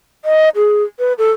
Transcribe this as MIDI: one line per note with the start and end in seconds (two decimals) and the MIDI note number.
0.25 0.49 75
0.56 0.83 68
0.99 1.13 71
1.18 1.31 69